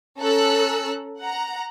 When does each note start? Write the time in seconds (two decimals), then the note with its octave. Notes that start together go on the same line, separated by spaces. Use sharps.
0.18 C#4 A4 A#5 E6 F#6
1.20 F#5 A#5